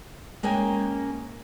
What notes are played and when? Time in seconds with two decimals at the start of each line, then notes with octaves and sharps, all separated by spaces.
0.43 G#3 A#3 C#4 G5 G#5